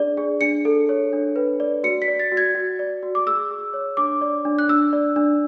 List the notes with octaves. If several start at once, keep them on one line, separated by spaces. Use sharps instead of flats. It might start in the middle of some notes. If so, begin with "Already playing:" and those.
Already playing: D4 G#4 D5
G#4
D4 C#7
A4
C#5
D4
B4
D5
F#4 C#7
B6
D5
A6
F#4
G#6
F#4
D5
F#4
D6
G#4 E6
G#4
C#5
D4 D6
D5
D4
F#6
D4 E6
D5
D4